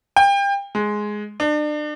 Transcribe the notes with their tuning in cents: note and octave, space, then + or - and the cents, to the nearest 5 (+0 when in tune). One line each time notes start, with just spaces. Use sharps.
G5 +30
G#3 +5
D4 +35